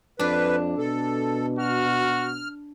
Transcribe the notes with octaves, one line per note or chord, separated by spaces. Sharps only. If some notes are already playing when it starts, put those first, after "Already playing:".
F2 D4 B4 D5
B2 A4
F#4 F6